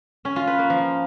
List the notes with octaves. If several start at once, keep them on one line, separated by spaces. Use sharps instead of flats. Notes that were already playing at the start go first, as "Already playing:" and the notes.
C#4
F4
B4
A#3
F3